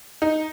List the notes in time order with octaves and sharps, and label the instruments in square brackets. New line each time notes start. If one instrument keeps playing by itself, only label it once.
[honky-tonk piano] D#4